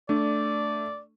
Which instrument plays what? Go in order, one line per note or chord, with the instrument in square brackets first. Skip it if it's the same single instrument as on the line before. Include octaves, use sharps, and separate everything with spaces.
[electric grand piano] A3 [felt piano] D4 [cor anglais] D5